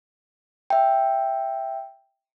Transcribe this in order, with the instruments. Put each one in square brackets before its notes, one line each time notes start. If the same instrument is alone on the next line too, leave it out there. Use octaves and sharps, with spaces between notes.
[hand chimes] E5 G5